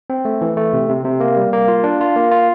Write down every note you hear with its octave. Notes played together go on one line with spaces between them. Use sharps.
C4
A3
E3
A3
C3
C3
C3
A#3
G3
A#3
F4
D4
F4
A#3
F4